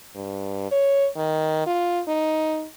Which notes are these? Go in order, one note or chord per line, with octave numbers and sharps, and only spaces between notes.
G2
C#5
D#3
F4
D#4